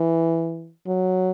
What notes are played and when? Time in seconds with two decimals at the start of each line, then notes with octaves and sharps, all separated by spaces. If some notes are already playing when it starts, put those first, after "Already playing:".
Already playing: E3
0.87 F#3